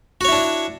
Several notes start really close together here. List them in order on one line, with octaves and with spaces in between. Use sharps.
F#4 C#5 E4 D4